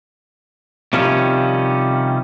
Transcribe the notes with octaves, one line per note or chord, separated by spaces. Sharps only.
C3 D#3 F3 G3 C#4